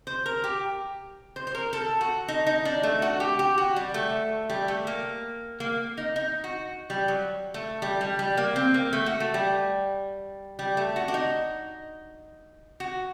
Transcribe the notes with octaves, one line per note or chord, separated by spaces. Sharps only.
C5
A#4
G4
C5
C5
A#4
A4
F#4
D#4
D#4
D4
A3
F#4
G4
G4
F#4
G3
A3
G3
A3
A#3
A#3
D#4
D#4
F#4
G3
F#3
A3
G3
G3
G3
A#3
C4
A#3
A3
F#4
A3
G3
G3
A3
F#4
D4
D#4
F#4